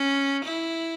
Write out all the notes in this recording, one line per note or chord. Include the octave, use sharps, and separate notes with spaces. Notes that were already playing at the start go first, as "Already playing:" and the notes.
Already playing: C#4
E4